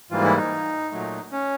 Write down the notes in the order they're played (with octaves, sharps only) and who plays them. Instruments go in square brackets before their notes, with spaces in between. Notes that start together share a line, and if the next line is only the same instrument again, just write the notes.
[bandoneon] G#2 E3 G3 A#3 F4
E4
D#4
A#2 F#3 A3
C#4